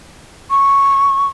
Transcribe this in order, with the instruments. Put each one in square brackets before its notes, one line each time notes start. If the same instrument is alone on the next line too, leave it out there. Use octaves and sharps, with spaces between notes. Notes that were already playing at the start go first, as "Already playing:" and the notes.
[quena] C#6